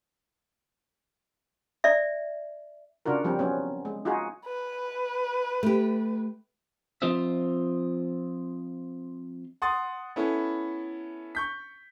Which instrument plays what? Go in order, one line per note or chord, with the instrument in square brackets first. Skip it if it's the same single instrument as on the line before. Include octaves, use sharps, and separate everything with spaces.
[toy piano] D5 E5
[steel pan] C#3 D4 F4 F#4 A#4
F3 G3 C4
F#3 B3 C#4
G#3
D#4 F4 F#4 G#4
[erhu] B4
[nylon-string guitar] A3 G4
[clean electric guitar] F3 C4 F4 C5 D#5 E5
[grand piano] F#5 C6 D#6 A6
B3 C#4 E4 A4
C#6 G6 B6